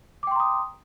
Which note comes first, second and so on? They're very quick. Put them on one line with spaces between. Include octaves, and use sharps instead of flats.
D6 G5 C6 A#5 D#6